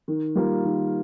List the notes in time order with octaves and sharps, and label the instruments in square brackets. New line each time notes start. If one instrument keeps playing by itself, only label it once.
[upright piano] D#3
G3 A#3 F4
D#3